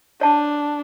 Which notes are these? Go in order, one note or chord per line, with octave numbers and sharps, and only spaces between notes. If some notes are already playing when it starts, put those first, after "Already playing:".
D4 C#5 A5